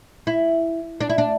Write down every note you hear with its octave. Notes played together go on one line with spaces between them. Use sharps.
E4
D4
E4
D4